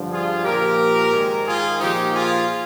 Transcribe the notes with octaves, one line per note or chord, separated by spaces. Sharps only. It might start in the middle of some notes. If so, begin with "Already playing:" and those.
Already playing: G2 D3 F3
F4 G#4
A#2 F3 G4 A#4
G#2 D#3
F4 G#4
A#2 F3 D#4 G4
F4 G#4